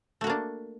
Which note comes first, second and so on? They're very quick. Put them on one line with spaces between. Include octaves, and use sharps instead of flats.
A3 F#4 A#3 D4